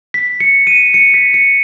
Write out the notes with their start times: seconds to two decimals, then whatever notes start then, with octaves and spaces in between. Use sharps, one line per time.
0.14 B6
0.40 C#7
0.67 D#7
0.94 C#7
1.14 B6
1.34 C#7